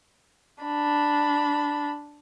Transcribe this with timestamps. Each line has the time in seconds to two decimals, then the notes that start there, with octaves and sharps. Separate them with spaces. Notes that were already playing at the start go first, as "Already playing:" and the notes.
0.64 D4 B5